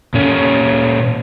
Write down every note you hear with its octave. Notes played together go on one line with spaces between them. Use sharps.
A#2 C#4